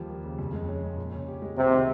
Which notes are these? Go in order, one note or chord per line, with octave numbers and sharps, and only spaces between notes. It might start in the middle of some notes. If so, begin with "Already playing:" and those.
Already playing: D#2 F3 G3
A#3
C#3
F2
G#3
C#4
C#3
A#2
C#4
G4
G#3
C#2 C3
D#3